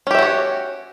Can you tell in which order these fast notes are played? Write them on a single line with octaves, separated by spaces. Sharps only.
C#4 G4 E5 F#4 C#5